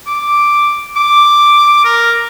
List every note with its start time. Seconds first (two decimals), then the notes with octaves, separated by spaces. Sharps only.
0.07 D6
0.96 D6
1.85 A#4